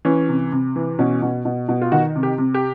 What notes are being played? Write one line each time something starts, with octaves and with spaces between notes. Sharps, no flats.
E3 C#4
C3
C3
E3
B2 C#4
B2
B2
B2
F4
D#3 F#4
C3
G4
C3
G4